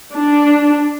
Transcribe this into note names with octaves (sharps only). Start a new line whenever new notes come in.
D4